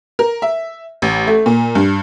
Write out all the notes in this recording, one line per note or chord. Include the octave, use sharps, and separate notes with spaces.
A#4
E5
A1
A3
A#2
G2